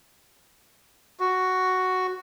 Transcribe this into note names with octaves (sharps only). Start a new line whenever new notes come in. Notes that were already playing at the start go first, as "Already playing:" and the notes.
F#4